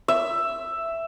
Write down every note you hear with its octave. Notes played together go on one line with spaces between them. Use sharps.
E5